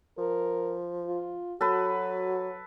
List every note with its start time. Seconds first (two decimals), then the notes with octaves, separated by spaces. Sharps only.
0.18 F3 A#4
1.07 F4
1.61 F#3 F#4 A4 B4